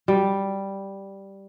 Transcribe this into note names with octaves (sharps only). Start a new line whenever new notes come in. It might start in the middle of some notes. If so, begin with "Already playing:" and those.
G3